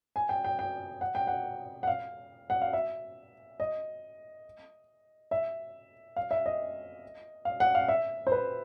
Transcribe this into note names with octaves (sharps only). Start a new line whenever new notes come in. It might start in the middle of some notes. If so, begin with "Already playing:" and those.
G#5
G5
G5
G5
F#5
G5
F#5
F#5
F5
F#5
F5
E5
D#5
E5
F5
E5
D#5
F5
F#5
F5
E5
C5
B4